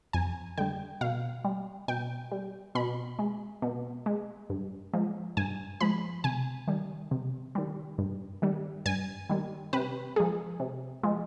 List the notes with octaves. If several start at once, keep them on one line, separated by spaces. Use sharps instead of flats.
F2 G#5
D3 G3 G5
B2 F5
G3
B2 G5
G3
B2 B5
G#3
B2
G#3
G2
F3 G#3
G2 G#5
F3 G#3 B5
C3 G#5
D#3 G3
C3
D#3 G3
G2
D#3 G3
G2 G#5
D#3 G3
C3 B4
F3 G#3 G#4
C3
F3 G#3